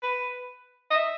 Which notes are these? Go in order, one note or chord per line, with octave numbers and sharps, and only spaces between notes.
B4
D#5
E5